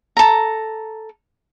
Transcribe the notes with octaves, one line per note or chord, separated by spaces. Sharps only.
A4 A#5